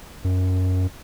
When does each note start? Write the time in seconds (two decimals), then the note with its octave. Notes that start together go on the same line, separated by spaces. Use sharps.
0.24 F#2